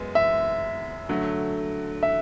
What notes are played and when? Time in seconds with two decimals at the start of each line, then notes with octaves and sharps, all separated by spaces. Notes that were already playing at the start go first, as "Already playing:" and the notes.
Already playing: F#2 G#3 B3
0.15 E5
1.09 D3 F#3 A3
2.03 E5